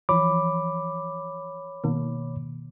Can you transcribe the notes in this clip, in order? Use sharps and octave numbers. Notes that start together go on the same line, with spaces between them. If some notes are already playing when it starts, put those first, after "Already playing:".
E3 F3 C#5 B5 D6
B2 D#3 A#3